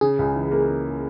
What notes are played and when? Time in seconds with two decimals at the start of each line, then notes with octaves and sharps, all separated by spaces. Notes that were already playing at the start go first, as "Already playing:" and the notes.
0.01 C#3 G#4
0.19 C#2
0.35 E3
0.51 A#3
0.68 C#3